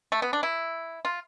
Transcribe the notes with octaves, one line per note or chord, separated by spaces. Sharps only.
A3
B3
D4
E4
F4